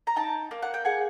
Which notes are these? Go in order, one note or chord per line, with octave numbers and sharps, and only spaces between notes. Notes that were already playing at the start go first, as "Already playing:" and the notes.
A#5
D#4 G5 A5
A#3
F#5
G5
G#4 F#5 G#5